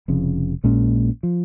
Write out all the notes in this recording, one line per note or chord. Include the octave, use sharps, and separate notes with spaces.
F1 F2 C#3
A#1 A#2 G#3 C#4
F3